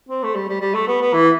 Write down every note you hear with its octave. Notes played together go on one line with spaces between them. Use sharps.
C4
A3
G3
G3
G3
A3
B3
B3
E3